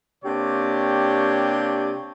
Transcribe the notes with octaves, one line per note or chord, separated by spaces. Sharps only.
C3 A#3 D4 G4 C#5